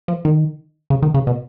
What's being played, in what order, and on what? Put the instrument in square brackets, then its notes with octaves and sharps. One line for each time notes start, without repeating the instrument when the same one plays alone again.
[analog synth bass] F3
D#3
C#3
D#3
C#3
B2